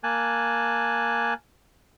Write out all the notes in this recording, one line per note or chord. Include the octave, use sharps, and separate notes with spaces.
A#3 G#5 A5 F#6